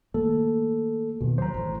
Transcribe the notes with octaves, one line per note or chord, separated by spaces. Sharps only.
D#3 A3 A#3 A4
D#2 B2 D#3
F#3 C5 A#5
A1 A2